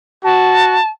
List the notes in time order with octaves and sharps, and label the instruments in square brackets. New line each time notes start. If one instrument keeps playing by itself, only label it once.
[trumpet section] F#4 [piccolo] A5